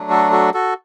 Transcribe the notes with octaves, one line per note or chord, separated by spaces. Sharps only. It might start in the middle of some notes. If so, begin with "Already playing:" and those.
Already playing: F#3 A3 D4
F#4 A4
F#4 A4
F#4 A4